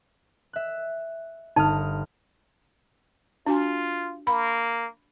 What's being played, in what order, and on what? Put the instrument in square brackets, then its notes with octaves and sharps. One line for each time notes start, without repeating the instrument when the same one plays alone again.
[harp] E5 F#6
[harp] G1 D#6 F6 [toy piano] D#4 A5
[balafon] D4 F#4 G#5 [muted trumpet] F4
[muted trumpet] A#3 [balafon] B5